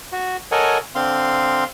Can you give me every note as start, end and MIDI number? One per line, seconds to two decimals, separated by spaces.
0.12 0.37 66
0.52 0.78 69
0.52 0.78 70
0.52 0.78 73
0.52 0.78 75
0.52 0.78 78
0.52 0.78 80
0.95 1.64 50
0.95 1.64 60
0.95 1.64 77
0.95 1.64 84